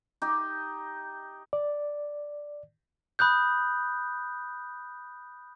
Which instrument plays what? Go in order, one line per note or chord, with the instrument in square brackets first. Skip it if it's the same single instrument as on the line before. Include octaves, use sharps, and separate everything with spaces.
[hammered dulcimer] D#4 G4
[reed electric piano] D5
[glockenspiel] B5 D#6 F#6 G6